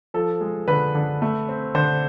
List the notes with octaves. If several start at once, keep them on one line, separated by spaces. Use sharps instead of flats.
F3 A4
G#3
D3 B4
D3
A3
C4
D3 C5